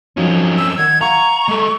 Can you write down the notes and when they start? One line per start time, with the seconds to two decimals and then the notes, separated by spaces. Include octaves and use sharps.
0.17 F2 F3 F#3 C#4 D#4
0.58 E6
0.78 D#3 F#5 G#6
1.01 F5 F#5 A#5 C#6
1.48 G#3 A4